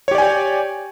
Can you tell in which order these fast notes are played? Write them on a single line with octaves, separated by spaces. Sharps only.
C#5 G4 D5 G#5 G5